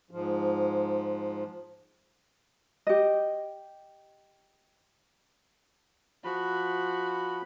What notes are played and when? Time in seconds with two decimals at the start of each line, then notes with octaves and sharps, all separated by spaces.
0.11 G#2 F3
2.87 G4 D#5
6.24 F3 F#4 B5